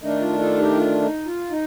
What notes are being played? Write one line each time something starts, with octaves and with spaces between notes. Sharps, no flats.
D#3 A3 D4 D#4
F4
F4 A4
D#4 G4
F4
D#4
F4
D#4